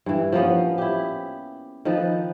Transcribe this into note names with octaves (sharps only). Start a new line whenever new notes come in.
G2 E3
F3 A#3 B3 C#4
E4 G4
D#3 F3 A4 B4